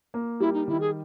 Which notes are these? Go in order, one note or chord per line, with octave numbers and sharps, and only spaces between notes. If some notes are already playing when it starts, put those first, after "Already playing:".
A#3
G3 E4
D#4
D#3 E4
G#4